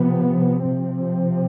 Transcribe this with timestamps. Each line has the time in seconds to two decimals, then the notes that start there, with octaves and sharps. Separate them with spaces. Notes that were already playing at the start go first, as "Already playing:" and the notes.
Already playing: C3 F3 B3
0.62 C3 F3 C4